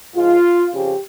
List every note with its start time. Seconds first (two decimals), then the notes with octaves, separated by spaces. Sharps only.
0.15 G#2 F3 G#3 F4
0.72 F2 C#3 F3 G4